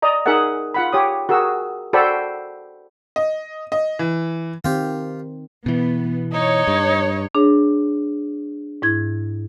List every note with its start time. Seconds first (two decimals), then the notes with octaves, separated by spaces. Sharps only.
0.02 D5 D#5 A#5
0.26 D#4 G#4 A#4 E5 F#5
0.74 F4 F#5 B5
0.93 G4 C#5 D#6
1.29 F#4 G#4 A#4 E6
1.93 F#4 A4 C5 D5 G5 B5
3.16 D#5
3.72 D#5
3.99 E3
4.64 D#3 C4 F4 G4
5.66 B2 E3 B3
6.33 D#4 C#5
6.68 G2
7.35 D4 G#4 C#5
8.82 G#2 E4 G#6